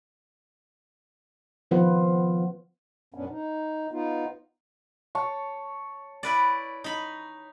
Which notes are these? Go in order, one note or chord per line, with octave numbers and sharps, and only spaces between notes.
D#3 F3 B3 F4 B4 F#5
F#2 A#2 B3 C#4 D4
D#4
B3 D#4 F4
C#5 A5 C#6
E4 B4 D5
D#4 B5